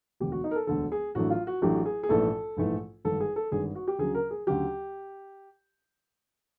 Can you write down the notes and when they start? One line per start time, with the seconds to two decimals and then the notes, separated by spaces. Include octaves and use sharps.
0.20 E1 D2 D3 G4
0.32 F#4
0.44 D#4
0.51 A#4
0.56 A4
0.67 E1 D2 D3 A4
0.92 G#4
1.15 A1 A2 F#3 A3 D4 F#4
1.30 F4
1.47 F#4
1.62 A1 A2 F#3 A3 D4 G4
1.85 G#4
2.03 G#4
2.09 A#1 G#2 E3 A3 A4
2.57 A#1 G#2 E3 A3
3.05 G#1 G2 D3 A4
3.20 G#4
3.36 A4
3.51 G#1 G2 D3 G#4
3.75 F#4
3.88 G4
3.98 D2 C#3 F#3 G#4
4.15 A#4
4.31 G#4
4.46 D2 C#3 F#3 G4